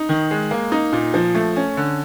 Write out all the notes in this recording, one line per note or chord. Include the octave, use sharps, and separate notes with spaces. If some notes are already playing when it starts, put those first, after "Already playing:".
Already playing: D#4
D#3
G#3
A#3
D#4
A#2
F3
A3
C#4
D3